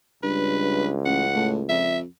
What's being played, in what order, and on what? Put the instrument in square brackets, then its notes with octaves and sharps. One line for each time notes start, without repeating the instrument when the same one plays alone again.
[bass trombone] C#2 [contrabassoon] G2 [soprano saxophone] B4
[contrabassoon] A1 [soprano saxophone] F#5
[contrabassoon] A2
[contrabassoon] F2 [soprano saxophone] E5